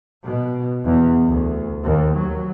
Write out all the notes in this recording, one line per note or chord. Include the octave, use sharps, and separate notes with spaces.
B2
E2
D2
D#2
F#3